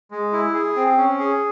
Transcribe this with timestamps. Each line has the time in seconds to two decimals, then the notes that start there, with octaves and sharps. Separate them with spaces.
0.11 G#3
0.32 E4
0.54 G#4
0.76 C4
0.97 C#4
1.19 G#4